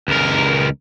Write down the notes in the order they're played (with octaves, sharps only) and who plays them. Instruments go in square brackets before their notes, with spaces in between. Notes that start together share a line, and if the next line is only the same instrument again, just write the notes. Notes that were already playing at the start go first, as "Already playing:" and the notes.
[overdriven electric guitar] C#2 A#4